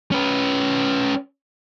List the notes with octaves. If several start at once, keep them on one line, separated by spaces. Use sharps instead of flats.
C#4 B4